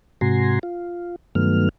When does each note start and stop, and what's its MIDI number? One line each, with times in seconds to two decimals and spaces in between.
0.21 0.59 44
0.21 0.59 48
0.21 0.59 66
0.21 0.59 80
0.21 0.59 82
0.21 0.59 84
0.63 1.16 65
1.35 1.69 43
1.35 1.69 51
1.35 1.69 54
1.35 1.69 57
1.35 1.69 59
1.35 1.69 89